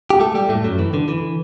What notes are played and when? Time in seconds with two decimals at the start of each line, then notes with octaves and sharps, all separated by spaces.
0.10 G4
0.20 A3 A4
0.35 G3 G4
0.49 A2 A3
0.64 F#2 F#3
0.79 E3
0.94 D3
1.08 E3